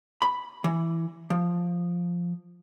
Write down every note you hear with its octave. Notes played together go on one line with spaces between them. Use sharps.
B5
E3
F3